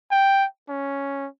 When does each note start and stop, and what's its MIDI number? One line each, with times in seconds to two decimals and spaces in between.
0.11 0.46 79
0.69 1.27 61